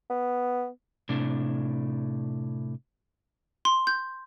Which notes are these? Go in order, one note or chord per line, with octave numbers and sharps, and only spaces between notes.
B3
A2 C3 D4
C6
G6